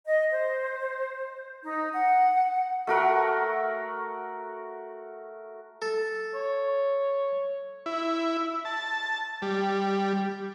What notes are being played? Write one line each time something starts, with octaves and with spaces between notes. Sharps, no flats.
D#5
C5
D#4
F#5
A3 F#4 A#4 F#5
A4
C#5
E4
A5
G3